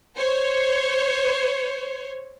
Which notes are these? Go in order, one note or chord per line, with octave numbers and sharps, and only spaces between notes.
C5 C#5